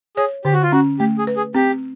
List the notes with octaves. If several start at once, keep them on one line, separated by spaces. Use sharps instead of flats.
G#4 C#5
D3 G4
F#4
F4
C#4 F#4
A3 G4
G#4
B4
G#4
C4 G4